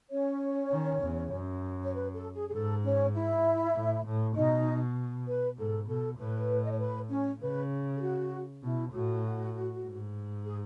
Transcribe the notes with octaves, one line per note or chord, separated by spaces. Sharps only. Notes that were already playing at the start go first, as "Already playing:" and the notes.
C#4 C#5
D#3
E2
F#2
C#5
B4
A4
G#4
G#4
G#2 A4
C#4 C#5
E4 E5
A2
A2
B2 D#4 D#5
B4
G#2 A4
B2 A4
A2 B4
D#5
C#5
B4
C#4 C#5
C#3 B4
G#4
F#4
B2 E4
A2 F#4
G#2
G#4